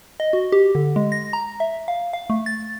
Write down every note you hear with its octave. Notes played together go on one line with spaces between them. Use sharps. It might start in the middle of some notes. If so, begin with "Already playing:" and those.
D#5
F#4
G4
D3
G#3
A#6
A#5
E5
F5
F5
A3
A6